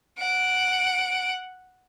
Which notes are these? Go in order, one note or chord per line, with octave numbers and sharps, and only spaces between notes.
F#5 D7